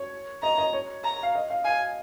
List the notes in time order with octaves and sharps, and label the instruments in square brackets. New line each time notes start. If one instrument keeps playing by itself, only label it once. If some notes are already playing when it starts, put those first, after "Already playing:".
Already playing: [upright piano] C#5
[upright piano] D#5 [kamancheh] A#5
[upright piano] D#5
C#5
[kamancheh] A#5
[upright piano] F5
D#5
F5
[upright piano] F5 [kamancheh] G#5